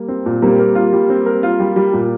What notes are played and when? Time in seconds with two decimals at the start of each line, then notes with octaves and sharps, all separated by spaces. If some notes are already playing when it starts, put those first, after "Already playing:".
Already playing: G3 A#3
0.08 C4
0.26 A#2
0.42 G3 A#3 C4
0.59 A#4
0.75 F4
0.93 G3
1.10 C4
1.26 A#4
1.43 F4
1.60 G3
1.76 G3
1.93 A#2